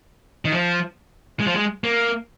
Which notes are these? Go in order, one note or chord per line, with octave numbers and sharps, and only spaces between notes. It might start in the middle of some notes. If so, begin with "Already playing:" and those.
D#3
F3
G#3
F3
G#3
A#3